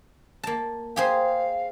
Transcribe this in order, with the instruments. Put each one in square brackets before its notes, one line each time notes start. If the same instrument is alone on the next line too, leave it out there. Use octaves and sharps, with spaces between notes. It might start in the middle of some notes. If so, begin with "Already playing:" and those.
[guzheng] A#3 A5
[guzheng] G4 G#4 C5 [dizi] F5